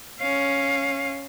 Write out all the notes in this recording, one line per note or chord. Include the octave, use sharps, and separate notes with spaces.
C#4 F5